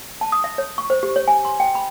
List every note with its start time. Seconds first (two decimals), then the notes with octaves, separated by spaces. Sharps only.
0.21 A5
0.32 D#6
0.44 E5
0.58 C#5
0.78 C#6
0.90 C5
1.03 G4
1.16 C#5
1.28 G#5
1.45 C6
1.60 G5
1.75 B5